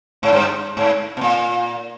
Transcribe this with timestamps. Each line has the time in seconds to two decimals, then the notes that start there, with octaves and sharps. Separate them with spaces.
0.23 G#2
0.33 G2
0.77 G#2
1.17 B2
1.21 A#2